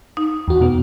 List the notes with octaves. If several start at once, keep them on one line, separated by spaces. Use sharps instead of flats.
D#4
E2 F#4
B2 B3